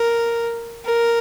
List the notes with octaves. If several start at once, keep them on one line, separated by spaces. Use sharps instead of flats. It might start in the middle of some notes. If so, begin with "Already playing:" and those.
Already playing: A#4
A#4